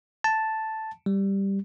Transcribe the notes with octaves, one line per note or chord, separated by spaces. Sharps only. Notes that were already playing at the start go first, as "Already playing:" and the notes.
A5
G3